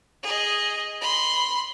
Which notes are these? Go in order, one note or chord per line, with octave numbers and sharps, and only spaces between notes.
G#4 D#5
B5 C6